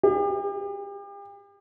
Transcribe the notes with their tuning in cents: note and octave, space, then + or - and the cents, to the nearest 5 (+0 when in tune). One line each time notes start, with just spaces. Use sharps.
G4 +40